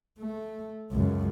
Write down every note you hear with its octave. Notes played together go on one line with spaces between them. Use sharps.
A3
C#2 F#2